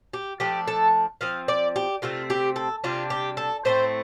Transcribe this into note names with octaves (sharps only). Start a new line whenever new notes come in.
G4
F3 A3 D4 G4
A4
F3 C4 F5
D5
G4
C3 A3 C4 F4
G4
A4
C3 G3 D4 F4
G4
A4
A2 A3 C4 C5